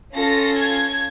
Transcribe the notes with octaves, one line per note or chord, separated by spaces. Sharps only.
C#4 F4 A4 A#6
G#6